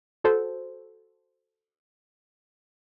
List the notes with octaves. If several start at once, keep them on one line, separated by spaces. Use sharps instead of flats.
F#4 A4 C5